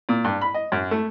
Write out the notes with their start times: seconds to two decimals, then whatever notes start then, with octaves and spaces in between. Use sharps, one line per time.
0.09 A#2
0.24 G2
0.41 B5
0.54 D#5
0.72 F#2
0.91 A3